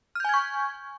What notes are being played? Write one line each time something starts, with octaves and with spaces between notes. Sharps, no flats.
G#5 C#6 F6 G6 G#6